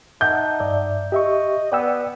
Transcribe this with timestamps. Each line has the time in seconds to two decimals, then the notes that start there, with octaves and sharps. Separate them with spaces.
0.21 D#4 E5 F#5 A5 G6
0.60 G2 D5 E5
1.12 G4 D#5 E5 C#6
1.72 B3 D5 G5 E6